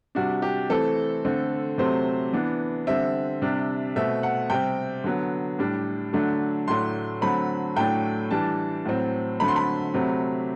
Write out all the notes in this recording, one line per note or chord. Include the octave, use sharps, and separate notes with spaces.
C3 G3 D4 F#4
G4
E3 A3 C4 A4
D3 A3 C4
C3 F#3 A3 C4 C5
E3 B3 D4
D3 G3 C4 E5
C3 G3 D4
B2 A3 C4 E5
F#5
C3 G3 C4 G5
D3 F#3 B3
A2 G3 D4
D3 F#3 A3 D4
A2 F#3 A3 D4 C6
D3 F#3 A3 C4 B5
A2 F#3 A3 D4 G5
E3 G3 D4 A5
A2 F#3 C4
D3 F#3 A3 C4 B5
C6
B5
C3 F#3 A3 C4